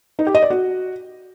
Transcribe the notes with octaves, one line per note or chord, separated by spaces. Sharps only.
D#4
G4
D#5
D5
F#4